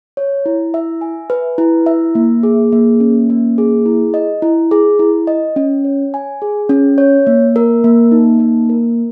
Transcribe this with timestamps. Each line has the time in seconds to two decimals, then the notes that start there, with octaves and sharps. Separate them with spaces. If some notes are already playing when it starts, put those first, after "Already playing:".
0.17 C#5
0.46 E4
0.74 E5
1.01 G#5
1.30 B4
1.58 E4
1.86 E5
2.15 A#3
2.43 G#4
2.72 A#3
3.00 C#4
3.30 A#3
3.58 G#4
3.86 E4
4.14 D#5
4.42 E4
4.71 G#4
4.99 E4
5.27 D#5
5.56 C#4
5.84 C#5
6.14 G#5
6.42 G#4
6.69 C#4
6.98 C#5
7.27 A#3
7.56 A#4
7.84 A#3
8.12 D#4
8.40 A#3
8.70 A#4